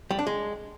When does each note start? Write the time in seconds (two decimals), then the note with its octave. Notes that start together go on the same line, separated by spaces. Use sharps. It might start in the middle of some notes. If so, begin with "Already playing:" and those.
0.11 G3
0.19 D4
0.27 G#3